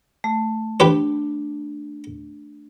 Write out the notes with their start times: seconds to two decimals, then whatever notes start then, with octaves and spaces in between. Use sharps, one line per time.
0.24 A3
0.80 D4 G4 B4 C5